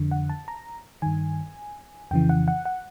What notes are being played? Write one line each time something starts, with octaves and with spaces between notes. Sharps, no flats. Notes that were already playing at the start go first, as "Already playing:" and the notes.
Already playing: F2 D3
F#5
A5
A#5
G2 D#3 G#5
F2 C#3 E3 G5
F#5
F#5
F#5